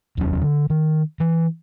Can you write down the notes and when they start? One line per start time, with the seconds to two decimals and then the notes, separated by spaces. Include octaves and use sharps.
0.17 F1 D#2 F#3 C#4
0.42 D3
0.70 D#3
1.20 E3